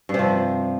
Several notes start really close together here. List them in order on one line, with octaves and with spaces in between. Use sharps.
G2 C3 F3